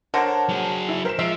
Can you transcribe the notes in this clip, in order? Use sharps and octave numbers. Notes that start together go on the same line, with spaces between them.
D3 A#4 C5 C#5 F#5 A5 A#6
F#3 G#4
E4
A#4 C5 B6 E7
F3 G#3 E5 C7 D7